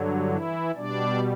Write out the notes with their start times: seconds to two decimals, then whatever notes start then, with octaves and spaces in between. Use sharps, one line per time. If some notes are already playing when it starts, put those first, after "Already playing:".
Already playing: G2 D3 F#3
0.28 E3 E4
0.76 B2 G3 D4 D5